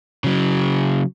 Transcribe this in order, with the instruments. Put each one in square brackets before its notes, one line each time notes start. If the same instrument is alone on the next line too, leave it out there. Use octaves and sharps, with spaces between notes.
[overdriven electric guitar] C#3 F#3